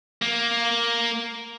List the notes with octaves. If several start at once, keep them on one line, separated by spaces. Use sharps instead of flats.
A#3